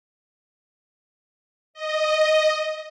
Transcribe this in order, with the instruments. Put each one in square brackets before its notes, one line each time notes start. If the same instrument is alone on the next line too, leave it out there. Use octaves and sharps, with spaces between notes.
[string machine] D#5